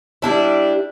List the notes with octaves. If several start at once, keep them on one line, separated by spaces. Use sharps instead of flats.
G3 D4 E4